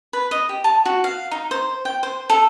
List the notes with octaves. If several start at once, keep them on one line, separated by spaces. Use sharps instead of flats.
B4
D#5
G4
A5
F#4
F5
D#4
C5
G5
C5
A4